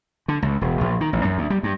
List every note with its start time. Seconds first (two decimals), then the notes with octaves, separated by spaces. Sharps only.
0.28 D3
0.42 C#2
0.61 E1
0.81 A#1
1.01 D#3
1.13 A1
1.25 F#2
1.38 D2
1.50 G3
1.63 G2